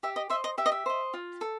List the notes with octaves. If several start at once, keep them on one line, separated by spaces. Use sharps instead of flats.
G4 E5
D#5
C5 D#5 E5
D#5
G4 E5
D#5
E5
C5 D#5
F4
A4